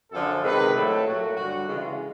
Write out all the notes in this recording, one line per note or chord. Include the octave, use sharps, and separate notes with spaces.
F#2 D3 F3 A4
C3 D#3 G#3 B4
A2 F#3 A3 A4
A#2 F#3 A3 F#4
G2 D3 G3 F#4
C#3 E3 G#3 F4